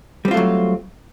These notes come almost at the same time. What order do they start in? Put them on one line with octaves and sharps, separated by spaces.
G3 C4 F4 A3 F#3